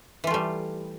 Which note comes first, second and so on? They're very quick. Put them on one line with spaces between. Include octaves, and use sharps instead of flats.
E3 F4 A3 G3